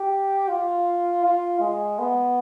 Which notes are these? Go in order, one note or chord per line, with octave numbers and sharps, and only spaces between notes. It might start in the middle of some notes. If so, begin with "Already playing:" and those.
Already playing: G4
F4
F4
G#3
B3